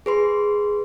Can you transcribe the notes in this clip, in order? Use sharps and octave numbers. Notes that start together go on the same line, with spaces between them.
G#4 B4 C6